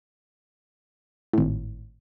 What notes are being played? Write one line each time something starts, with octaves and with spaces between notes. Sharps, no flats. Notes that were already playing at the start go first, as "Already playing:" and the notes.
G#1 A2